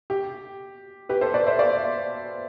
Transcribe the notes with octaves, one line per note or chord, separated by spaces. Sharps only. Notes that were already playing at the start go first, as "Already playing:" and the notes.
G4
G4 B4
A4 C5
B4 D5
C5 E5
D5 F5